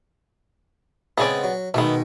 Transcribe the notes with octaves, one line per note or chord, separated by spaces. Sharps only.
C#3 G#3 B3 C4 G#4 D5
F#3
B2 D#3 G#3 A3 B3